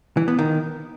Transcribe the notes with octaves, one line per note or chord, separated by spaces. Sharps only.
E3
B3
D#3